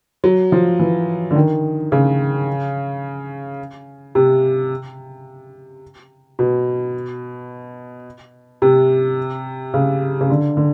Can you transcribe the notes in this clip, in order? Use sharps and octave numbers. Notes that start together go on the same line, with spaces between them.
F#3
F3
E3
D3
D#3
C#3
C3
B2
C3
C#3
C#3
D3
D3